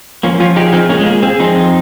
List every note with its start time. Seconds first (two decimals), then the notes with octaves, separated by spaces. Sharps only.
0.23 F3 A#3 C#4
0.40 F3 C#4 F4
0.56 D#4 G4 G#4
0.73 C4 D#4 F4
0.89 A#3 C#4 G#4
0.99 G#3
1.06 A#3 G#4
1.23 C4 G#4
1.40 F3 C4 D#4
1.56 F2